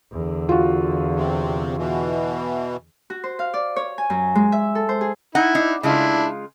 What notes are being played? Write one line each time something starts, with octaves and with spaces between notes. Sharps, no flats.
E2 D3
F4 F#4
C3
B2 E3
F#4
C5
F5
D5
C#5
G#5
F#2
G#3
E5
A4
C5
G#4
D#4 E4 F#5
D4 D#4
C#3 G#3 D4 E4 F4